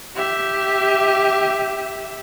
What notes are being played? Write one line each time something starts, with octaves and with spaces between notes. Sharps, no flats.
G4 E5